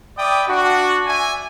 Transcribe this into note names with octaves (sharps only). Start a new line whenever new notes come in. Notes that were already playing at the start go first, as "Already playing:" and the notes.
D5 E5 G5 B5 D#6
D4 F#4
D5 E5 G#5